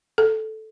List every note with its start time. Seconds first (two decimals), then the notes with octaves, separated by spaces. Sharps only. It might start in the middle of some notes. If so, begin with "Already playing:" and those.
0.18 A4